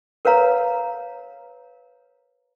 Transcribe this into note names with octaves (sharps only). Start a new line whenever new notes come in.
A#4 B4 C#5 F5 A#5